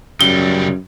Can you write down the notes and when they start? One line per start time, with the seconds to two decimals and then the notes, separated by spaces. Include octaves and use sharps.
0.21 F#2 C#3 G3 G7